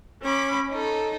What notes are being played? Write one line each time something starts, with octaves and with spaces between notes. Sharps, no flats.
C#4 B5 D6
D#4 A4